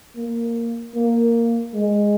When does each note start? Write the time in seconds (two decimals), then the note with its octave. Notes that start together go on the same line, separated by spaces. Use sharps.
0.16 A#3
0.95 A#3
1.74 G#3